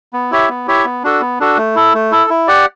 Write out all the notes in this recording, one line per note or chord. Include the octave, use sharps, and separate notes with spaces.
B3
E4 G4 C#5 E5
B3
E4 G4 C#5 E5
B3
D4 F#4 A4
B3
D4 F#4 A4
A3
E4 A4
A3
E4 A4
E4
G4 D5 F#5